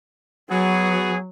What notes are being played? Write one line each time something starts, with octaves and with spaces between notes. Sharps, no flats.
F#3 B3 F#4 G#4